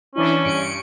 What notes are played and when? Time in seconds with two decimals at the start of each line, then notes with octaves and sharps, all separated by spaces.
0.16 E3 C#4 D4 E4
0.45 G2 C#7 D7